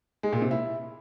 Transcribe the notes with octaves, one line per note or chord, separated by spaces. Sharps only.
G#3
A#2
C3
E4